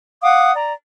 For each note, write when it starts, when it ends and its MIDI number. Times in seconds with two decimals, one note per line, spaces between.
0.22 0.52 77
0.22 0.52 78
0.22 0.52 86
0.22 0.52 87
0.54 0.73 74
0.54 0.73 82